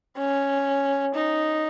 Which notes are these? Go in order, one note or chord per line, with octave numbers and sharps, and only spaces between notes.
C#4
D#4